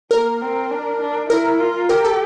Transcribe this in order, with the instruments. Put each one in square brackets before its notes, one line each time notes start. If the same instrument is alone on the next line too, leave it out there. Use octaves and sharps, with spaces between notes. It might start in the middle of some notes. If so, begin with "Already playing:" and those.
[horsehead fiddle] A#3 [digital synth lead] A#4
[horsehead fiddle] C4
D4
D4
[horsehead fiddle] E4 [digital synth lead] A#4
[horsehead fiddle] F4
[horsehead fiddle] G4 [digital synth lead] A#4
[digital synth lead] A4